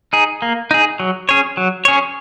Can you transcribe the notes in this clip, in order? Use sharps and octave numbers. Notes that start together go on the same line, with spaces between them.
D#4 G#4
A#3
D#4 G#4
F#3
C#4 G#4 C#5
F#3
C#4 G#4 C#5